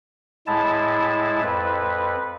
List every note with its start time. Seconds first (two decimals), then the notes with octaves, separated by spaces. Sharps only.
0.47 A2 G#3 E4 A5
1.42 F2 B4